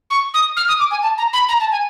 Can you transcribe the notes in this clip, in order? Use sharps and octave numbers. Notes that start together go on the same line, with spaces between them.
C#6
D#6
F6
D#6
D6
G#5
A5
A#5
B5
A#5
A5
G#5